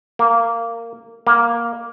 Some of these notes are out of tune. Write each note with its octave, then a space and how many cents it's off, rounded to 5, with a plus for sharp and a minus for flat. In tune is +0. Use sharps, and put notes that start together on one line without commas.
A#3 -15
A#3 +5